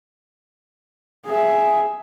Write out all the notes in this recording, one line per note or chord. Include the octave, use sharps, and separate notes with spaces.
G#4 E5